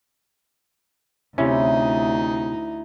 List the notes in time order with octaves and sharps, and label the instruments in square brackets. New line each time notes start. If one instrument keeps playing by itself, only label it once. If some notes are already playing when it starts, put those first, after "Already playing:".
[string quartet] D2 D#4 [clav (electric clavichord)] C3 C#4 [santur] E4